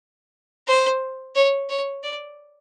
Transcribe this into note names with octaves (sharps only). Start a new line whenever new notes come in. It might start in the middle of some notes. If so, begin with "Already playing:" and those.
C5
C#5
C#5
D5